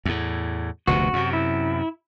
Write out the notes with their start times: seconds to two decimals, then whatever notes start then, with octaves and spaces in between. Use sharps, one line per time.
0.05 E2 A2
0.87 F1 D2 B2 F#4
1.13 F#2 C3
1.33 E4